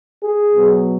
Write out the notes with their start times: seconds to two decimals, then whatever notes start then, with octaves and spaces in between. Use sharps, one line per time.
0.23 G#4
0.54 B2 F#3